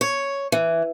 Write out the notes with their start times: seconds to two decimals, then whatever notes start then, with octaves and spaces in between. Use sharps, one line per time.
0.01 C#5
0.52 E3